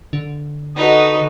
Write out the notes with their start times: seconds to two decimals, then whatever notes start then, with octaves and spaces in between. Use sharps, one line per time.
0.13 D3
0.76 D#4 F#4 A4 B4 D#5